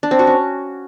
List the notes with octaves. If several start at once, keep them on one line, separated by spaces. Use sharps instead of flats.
D4
C4
F#4
C#4